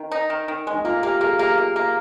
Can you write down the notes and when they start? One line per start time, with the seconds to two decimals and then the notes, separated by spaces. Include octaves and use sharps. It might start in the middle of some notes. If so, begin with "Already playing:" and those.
Already playing: D#3
0.12 D#4
0.30 D#3
0.48 D#3
0.67 G#3
0.74 D#4
0.84 A#3 F4
1.02 A#3 G4
1.21 A#3 G#4
1.33 F4
1.39 A#3 G4
1.58 A#3
1.76 A#3